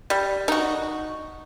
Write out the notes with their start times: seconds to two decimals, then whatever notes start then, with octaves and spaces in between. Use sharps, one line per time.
0.10 G3
0.48 D#4 F#4